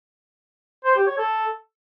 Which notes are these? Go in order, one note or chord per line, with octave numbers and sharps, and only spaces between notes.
C5
G4
C#5
A4